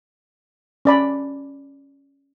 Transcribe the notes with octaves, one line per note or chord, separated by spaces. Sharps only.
C#4 D5 B5